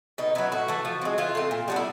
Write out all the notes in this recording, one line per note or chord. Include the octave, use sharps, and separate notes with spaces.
B2 D#4
F#3 B3 E4
A2 F#4
E3 A3
F3
G#3 C4
E3 F4
A3 C4
A#2
G3 B3 D4
E4